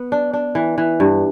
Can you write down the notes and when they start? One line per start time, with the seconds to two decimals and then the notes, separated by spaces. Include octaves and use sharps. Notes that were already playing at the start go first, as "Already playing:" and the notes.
Already playing: B3
0.12 D4
0.33 D4
0.55 E3
0.78 E3
1.00 G2